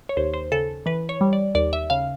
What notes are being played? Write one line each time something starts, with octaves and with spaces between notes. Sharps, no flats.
C#5
D#2 C5
C5
C#3 A4
E3 B4
C#5
G3
D5
D#2 D5
E5
C#3 F5